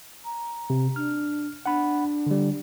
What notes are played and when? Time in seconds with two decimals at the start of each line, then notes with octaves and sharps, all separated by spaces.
0.25 A#5
0.70 C3
0.96 D4 F6
1.66 D4 F#5 B5
2.26 D3 G3